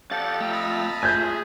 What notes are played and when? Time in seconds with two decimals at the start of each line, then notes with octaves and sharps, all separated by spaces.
0.11 F2 G4 A4 D5 F5 F#5 A6
0.41 A3 F4 G5 A#5 E6
0.52 D#5 A5 B5
1.03 A3 F4 G#4 E5 G#5 G6 G#6